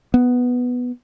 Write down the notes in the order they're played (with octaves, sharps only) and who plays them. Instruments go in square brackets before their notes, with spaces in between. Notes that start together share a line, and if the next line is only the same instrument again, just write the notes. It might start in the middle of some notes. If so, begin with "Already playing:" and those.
[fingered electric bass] B3